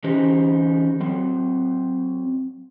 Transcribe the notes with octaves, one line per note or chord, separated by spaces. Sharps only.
D3 E3 C#4 D#4 G4 C5
F#3 C4